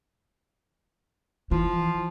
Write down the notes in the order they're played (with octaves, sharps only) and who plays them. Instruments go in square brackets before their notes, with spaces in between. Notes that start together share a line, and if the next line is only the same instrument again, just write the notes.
[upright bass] E3 [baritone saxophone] F3